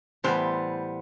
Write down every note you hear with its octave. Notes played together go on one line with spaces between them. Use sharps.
A2 E3 G3 B3 C5